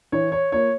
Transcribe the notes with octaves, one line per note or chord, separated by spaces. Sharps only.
E3 C#5
C#5
A#3 F4 C#5